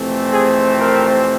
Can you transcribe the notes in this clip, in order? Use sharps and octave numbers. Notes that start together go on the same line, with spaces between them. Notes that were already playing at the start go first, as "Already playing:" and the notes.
Already playing: F2 C3 E3 A3 C4
G#4
A#4